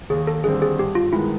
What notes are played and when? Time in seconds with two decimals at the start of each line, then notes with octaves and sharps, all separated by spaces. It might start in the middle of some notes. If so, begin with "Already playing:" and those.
0.10 D#2 G#4
0.27 A4
0.44 D3 G3 C4 G#4
0.62 G#4
0.79 G2 G4
0.95 F4
1.13 D#3 G#3 B3 E4